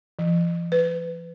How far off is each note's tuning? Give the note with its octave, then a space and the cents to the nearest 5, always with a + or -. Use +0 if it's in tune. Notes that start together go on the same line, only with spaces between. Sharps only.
F3 -40
B4 +25